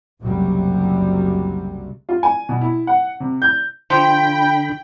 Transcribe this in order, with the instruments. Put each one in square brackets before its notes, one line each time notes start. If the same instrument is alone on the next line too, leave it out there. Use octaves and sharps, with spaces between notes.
[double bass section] F#1 C2 C3 F#3 G3
[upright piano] F4
G#5
B2
E4
F#5
C3
G6
[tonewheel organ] D3 B5 [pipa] F3 [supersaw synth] G5